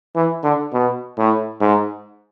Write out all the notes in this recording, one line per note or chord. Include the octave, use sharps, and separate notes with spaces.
E3
D3
B2
A2
G#2